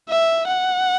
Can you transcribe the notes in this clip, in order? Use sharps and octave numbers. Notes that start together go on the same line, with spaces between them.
E5
F#5